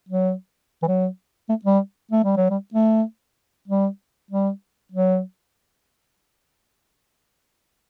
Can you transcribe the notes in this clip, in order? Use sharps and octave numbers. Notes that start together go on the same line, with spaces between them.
F#3
E3
F#3
A3
G3
A3
G3
F#3
G3
A3
G3
G3
F#3